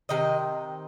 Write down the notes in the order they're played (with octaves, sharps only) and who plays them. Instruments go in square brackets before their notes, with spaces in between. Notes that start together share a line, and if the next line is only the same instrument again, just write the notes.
[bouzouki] C3 D#3 D#5